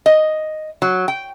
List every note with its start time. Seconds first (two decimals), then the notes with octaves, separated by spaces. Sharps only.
0.06 D#5
0.82 F#3
1.08 G5